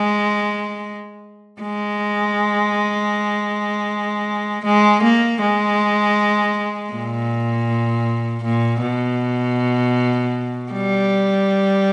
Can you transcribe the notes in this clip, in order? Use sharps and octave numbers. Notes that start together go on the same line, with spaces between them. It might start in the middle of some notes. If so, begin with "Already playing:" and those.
Already playing: G#3
G#3
G#3
A#3
G#3
A#2
A#2
B2
G3